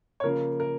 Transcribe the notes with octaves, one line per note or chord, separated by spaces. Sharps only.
C#5
C#3 F3 A#3 A#4
A#4